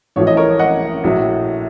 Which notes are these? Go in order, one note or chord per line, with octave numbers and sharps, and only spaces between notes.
A1 A2 F3 A3 C#5
D#5
A#4 C#5
D#5 F#5
A#1 A2 F#3